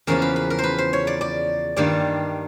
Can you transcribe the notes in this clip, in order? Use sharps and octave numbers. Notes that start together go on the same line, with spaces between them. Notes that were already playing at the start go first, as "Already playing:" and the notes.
E2 C#3 F3 A#3 A#4
B4
B4
A#4
B4 C5
C5
C#5
D5
D5
G2 D#3 G3 A#3 D5